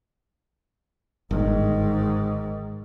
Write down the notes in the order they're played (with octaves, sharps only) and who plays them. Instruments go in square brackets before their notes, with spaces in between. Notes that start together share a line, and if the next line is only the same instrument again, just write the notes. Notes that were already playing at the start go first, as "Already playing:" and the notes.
[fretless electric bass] G1 [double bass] G#2 D#3